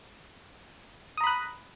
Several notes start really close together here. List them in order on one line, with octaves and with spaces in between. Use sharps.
D#6 A#5 B5 F#6